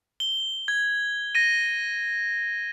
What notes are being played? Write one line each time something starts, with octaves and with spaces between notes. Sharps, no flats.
G7
G#6
A#6 D#7